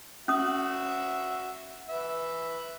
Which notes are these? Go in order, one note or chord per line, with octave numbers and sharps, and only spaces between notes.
C#4 F#4 E5 D#6
B4 E5